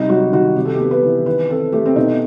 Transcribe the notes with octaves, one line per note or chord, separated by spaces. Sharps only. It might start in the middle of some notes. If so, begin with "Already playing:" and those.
Already playing: C3 G3 D#4
F#3 F#4
D#3 F#4
C3 G4
A4
G4
B3
B4
E3
D#3 B4
C4 A4
A3 G4
C4
B2 D#4